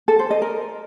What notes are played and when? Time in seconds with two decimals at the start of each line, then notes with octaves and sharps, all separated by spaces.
0.08 A4
0.19 C5
0.30 D#5
0.42 A#4